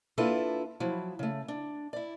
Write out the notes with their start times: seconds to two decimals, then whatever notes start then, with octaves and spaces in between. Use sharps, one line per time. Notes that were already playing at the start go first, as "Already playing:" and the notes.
0.18 A#3 D4 E4 F4 A4 B4
0.80 F3 F#3 E4
1.19 C#3 A3
1.48 D4
1.93 E4 D5